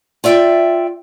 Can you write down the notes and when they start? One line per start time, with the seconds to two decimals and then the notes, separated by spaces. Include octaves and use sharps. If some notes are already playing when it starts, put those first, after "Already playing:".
0.24 F4 D5 E5 F5 G5